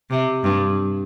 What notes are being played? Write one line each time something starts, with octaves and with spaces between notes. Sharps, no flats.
C3
G2